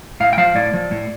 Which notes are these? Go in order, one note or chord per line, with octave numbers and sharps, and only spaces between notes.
A2 F5
G5
F3 F5
A2 D5
F3
A2